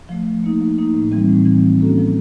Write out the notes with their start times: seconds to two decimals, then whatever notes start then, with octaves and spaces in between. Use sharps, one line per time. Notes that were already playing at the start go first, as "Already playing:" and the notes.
0.09 F3 A3
0.27 F3
0.44 A#3 D#4
0.61 F3
0.78 A#3 D#4
0.94 A2
1.12 E3 G3 C4
1.29 A2
1.46 E3 G3 C4
1.64 F3
1.80 A#3 C#4 F#4 A4
1.98 F3